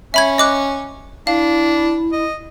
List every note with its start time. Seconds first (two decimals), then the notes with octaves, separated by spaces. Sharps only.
0.14 C#4 E5 B5 G#6
0.38 D#5 D6 F#6
1.27 D4 E4 F5
2.12 D#5